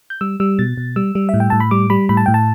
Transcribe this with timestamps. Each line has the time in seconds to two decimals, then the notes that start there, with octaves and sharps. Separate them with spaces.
0.10 G6
0.21 G3 E6
0.40 G3 E6
0.59 B2 A6
0.77 B2
0.96 G3 E6
1.15 G3
1.29 A2 E5
1.40 G5
1.50 A2 A5
1.60 B5
1.71 G3 D6
1.90 G3 B5
2.09 A2 B5
2.17 A5
2.26 A2 G5
2.34 A5